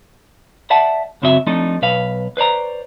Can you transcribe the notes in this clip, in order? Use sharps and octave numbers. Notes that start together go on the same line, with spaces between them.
D5 E5 F#5 A5
F#2 C#3 C4 F#4 D#5 E5
F3 A3 C4 D4 D#4
B1 B4 F5
B4 C5 D5 A#5